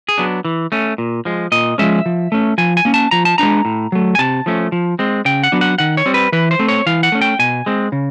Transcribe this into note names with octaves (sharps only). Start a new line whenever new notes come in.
G#4
F#3 B3 D4
E3
A3 C#4
A#2
F3 G#3
A#2 D#5
F3 G#3 C#4 E5
F3
A3 C#4
F3 G#5
G#5
A#3 C#4
A5
F3 A#5
A5
G#3 B3 D4 A#5
A2
F#3 A3
G#5
C3 A5
F3 A3 C#4
F3
G#3 C4
C#3 G5
F#5
F#3 B3 D4
F#5
D#3 F#5
C#5
G3 C4
B4
E3 B4
C5
A3 C4
C#5
E3 F5
F#5
A3 C#4
G5
B2 G#5
G#3 C4
C#3